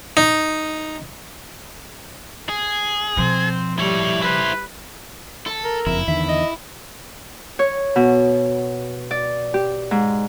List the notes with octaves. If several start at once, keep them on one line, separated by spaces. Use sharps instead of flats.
D#4
G#4
B2 F3 C4 C5
G3 E4 C#5
E4 B4 C5
A4
A#4
F#1 F2 E4
E2 D3 D#3 E5
D#5
C#5
B2
D5
G4
G#2